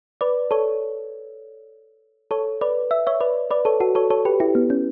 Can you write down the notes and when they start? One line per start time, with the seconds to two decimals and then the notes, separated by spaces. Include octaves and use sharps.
0.21 B4 D5
0.51 A4 C#5
2.31 A4 C#5
2.61 B4 D5
2.91 E5
3.07 C#5 E5
3.20 B4 D5
3.51 B4 D5
3.65 A4 C#5
3.80 F#4 A4
3.95 A4 C#5
4.10 A4 C#5
4.25 G4 B4
4.40 E4 G4
4.55 B3
4.70 C#4